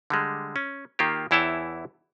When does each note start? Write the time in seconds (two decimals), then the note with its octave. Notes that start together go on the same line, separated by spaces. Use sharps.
0.10 D3 G3 G#3
0.56 C#4
0.99 D#3 A#3 F4 G4
1.31 E2 E3 E4 C#5 G5 A5